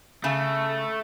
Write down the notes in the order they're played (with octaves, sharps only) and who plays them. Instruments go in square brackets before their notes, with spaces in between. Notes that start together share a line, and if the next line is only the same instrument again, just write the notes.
[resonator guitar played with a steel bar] C#3 [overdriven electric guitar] A3